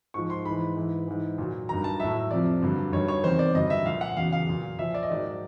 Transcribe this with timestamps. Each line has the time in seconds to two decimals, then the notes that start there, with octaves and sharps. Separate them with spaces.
0.14 G#2 F3 C#6
0.30 C6
0.45 G#2 E3 B5
0.76 G#2 E3
1.07 G#2 E3
1.38 A#2 F#3
1.69 G2 D#3 F#3 A#5
1.84 A5
1.99 A2 F#3 E5
2.31 F2 C3 F3 D5
2.62 G2 D3 F#3
2.92 G2 D#3 F#3 C#5
3.08 C#5
3.23 E2 C3 D#3 C5
3.39 D5
3.55 G2 D3 F#3 D#5
3.70 E5
3.86 A#2 F3 F5
4.01 F#5
4.17 E2 C#3 F#3 F5
4.33 F5
4.47 A#2 F#3
4.79 A#2 F3 E5
4.94 D5
5.03 D#5
5.09 G#2 D#3 F#3 D5